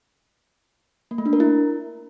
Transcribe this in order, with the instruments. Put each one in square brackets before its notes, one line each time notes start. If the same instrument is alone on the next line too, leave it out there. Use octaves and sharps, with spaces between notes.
[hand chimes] A#3
A3
D4
A#4
E4